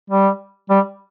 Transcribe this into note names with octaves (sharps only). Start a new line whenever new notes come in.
G3
G3